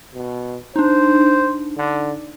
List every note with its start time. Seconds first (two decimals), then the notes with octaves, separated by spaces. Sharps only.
0.14 B2
0.76 D4 D#4 C5
1.77 D3